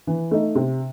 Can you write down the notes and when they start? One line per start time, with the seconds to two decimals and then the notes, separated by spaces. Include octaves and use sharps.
0.07 E3
0.31 A3 D#4
0.55 C3